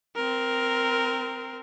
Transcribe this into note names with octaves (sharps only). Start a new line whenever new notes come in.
C4 A#4